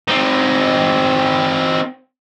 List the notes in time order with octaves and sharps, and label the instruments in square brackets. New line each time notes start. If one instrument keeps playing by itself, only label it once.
[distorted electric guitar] C4 D#4